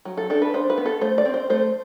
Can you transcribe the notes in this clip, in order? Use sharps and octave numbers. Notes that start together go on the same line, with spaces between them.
F#3
A4
D4 A4
B4
D4 C5
B4
B3
A4
A3 C5
D5
C4
C5
A3 C5